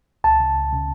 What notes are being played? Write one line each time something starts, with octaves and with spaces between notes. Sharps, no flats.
C#2 A5
C#3
C#2
C#3